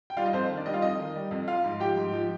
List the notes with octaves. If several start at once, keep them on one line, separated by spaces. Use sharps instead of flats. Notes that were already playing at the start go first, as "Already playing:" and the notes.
G5
G3 F4 F5
D#4 D#5
F2 C5
D#3
D4 D5
G3 D#4 D#5
F4 F5
F2 D#4 D#5
D#3
G3
F2
F3 F4 F5
G#2
F3 G4 G5
G#2
F3